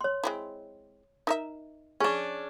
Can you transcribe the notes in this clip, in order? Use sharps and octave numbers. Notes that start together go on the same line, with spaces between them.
C#5 C6
G#3 C4 E4
D#4 A#4 E5
C#4 D4 G#4 C#6